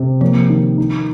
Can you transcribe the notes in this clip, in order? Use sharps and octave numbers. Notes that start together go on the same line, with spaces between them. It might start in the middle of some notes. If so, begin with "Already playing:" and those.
Already playing: C3
F3 A#3
D#3
D#4